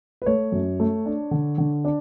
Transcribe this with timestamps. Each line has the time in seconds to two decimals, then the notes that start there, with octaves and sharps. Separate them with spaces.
0.22 B4
0.26 A3 C#5
0.52 F#2
0.80 A3
1.06 D4
1.31 D3
1.58 D3
1.84 D4 D5